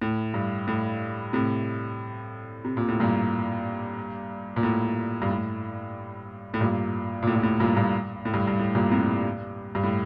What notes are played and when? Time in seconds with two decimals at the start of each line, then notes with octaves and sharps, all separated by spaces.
0.02 A2
0.34 G2
0.67 A2
1.33 A2 C3
2.65 C3
2.77 A#2
2.89 A2
3.00 G2 A#2
4.56 A#2
4.63 A2
5.22 G2
5.29 A2
6.54 A2
6.60 G2 A#2
7.23 A#2
7.27 A2
7.36 A#2
7.43 A2
7.60 G2 A#2
7.76 G2 A#2
8.25 A2
8.34 G2
8.47 G2
8.59 A2
8.75 G2 A#2
8.91 A2 C3
9.75 G2
9.83 A2